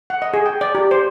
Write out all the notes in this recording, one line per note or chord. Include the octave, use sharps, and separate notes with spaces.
F#5
D#5
G#4
G5
D5
G4
C5